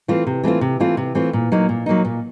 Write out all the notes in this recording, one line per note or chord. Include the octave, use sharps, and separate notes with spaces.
E3 A3 C4 F4
C3
E3 A3 C4 F4
C3
E3 A3 C4 F4
C3
E3 A3 C4 F4
A#2
F#3 A#3 D#4
A#2
F#3 A#3 D#4
A#2